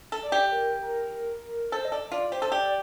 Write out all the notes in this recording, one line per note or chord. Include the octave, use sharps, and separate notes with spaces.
A4
D5
G4
A#4
A#4
A4 C5
D#5
A4 D5
F4 D5
G4 C5
A4
G4 D5